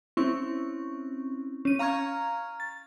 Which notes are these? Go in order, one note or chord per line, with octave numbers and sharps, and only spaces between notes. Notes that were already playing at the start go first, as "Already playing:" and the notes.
C4 C#4 E4 C#6
C#4 D#7
F5 A#5 C#6 F6 G#6
A6